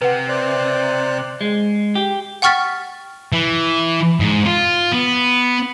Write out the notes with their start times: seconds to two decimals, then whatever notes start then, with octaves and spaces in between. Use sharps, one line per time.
0.02 C3 B4 F#5
0.29 C5 D5 F#6
1.41 G#3
1.95 G4
2.42 F#5 G5 C#6 F6 A6 B6
3.33 E3
4.20 G#2
4.46 F4
4.92 B3